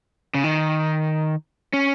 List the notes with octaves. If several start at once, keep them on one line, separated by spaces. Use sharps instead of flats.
C#3
D#3
C#4